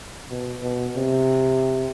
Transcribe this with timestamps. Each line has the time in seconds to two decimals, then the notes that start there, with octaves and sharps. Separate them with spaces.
0.30 B2
0.63 B2
0.96 C3